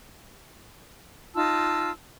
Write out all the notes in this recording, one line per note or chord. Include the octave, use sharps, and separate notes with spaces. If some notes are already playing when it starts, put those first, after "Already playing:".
D#4 F4 A5 E6